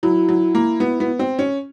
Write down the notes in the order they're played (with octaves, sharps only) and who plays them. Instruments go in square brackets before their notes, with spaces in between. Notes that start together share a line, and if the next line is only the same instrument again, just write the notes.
[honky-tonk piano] F#3 [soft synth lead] E4
[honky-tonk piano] F#3
A#3
B3
B3
C4
C#4